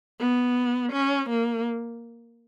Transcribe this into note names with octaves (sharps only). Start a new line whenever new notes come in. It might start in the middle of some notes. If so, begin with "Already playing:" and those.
B3
C#4
A#3